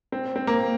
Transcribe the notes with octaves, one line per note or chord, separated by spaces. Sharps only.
C4
C4
A#3